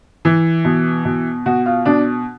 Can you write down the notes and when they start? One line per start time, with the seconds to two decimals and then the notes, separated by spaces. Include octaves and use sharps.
0.25 E3
0.65 B2
1.05 B2
1.46 B2 F#4
1.66 F4
1.86 B2 D4